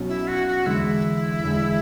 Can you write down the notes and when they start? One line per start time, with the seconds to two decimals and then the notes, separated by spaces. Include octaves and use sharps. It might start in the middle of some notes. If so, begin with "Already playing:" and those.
Already playing: B1 B2 F#3 C#4
0.08 E4
0.28 F#4
0.47 F#4
0.66 E2 D3 G#3 E4
1.44 E2 D3 G#3